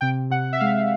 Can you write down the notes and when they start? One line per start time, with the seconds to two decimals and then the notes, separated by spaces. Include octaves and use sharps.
0.01 C3 G5
0.30 C3 F#5
0.53 E5
0.60 G#3 F5